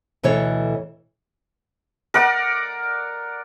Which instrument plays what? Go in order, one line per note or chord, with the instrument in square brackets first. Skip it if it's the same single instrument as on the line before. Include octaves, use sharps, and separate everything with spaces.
[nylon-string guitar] D2 B2 E3 A4 C#5
[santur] A#4 D5 F#5